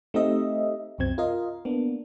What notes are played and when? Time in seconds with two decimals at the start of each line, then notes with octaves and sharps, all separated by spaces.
0.14 A3 C4 D#4 G4 D#5 E5
0.98 C2 F#2 F#3 C4 G#6
1.18 F4 A#4 D#5 F5
1.65 A#3 B3 D4